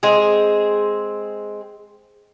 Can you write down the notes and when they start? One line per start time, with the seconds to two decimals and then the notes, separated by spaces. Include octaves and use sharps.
0.03 G#3 C4 G#4